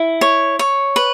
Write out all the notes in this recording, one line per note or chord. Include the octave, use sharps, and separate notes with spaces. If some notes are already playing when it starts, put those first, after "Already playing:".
Already playing: E4
C#5
C#5
B4